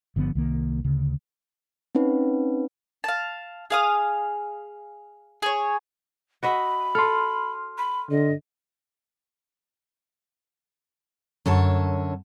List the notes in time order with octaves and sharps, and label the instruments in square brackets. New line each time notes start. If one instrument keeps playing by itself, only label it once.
[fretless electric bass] G1 D3 F3 B3
C2 D#3 F3 A#3
D2 C#3
[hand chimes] C4 C#4 D#4 B4
[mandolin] F5 A5
G#4 F5 D#6
G#4 C#5
[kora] F#4 D#5 E5 [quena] B5
[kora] A4 [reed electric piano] C6 F6
[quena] B5
[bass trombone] D3 [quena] D#5
[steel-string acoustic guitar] F#2 D3 C#5 A5